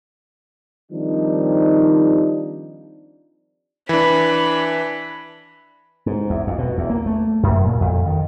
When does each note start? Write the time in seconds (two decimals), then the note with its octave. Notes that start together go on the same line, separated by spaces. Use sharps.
0.92 D#3 F3 G3 C4 D4 D#4
3.89 E3 D4 B5
6.06 G#2
6.30 E2
6.47 F2
6.58 B2
6.78 E2
6.90 A#3
7.06 A3
7.43 F#2
7.66 A#2
7.80 F2
8.06 D#3